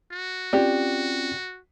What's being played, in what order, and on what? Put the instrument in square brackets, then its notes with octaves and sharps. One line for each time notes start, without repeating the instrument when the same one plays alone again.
[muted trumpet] F#4
[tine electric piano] C4 C#4 F4 [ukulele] G4 D5